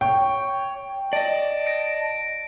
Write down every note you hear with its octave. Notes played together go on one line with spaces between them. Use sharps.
C#5 G5
D5 D#5 A5 D7
A#6 D7